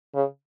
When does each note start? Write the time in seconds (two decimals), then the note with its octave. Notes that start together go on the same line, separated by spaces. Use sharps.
0.15 C#3